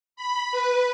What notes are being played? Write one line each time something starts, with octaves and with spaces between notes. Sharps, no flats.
B5
B4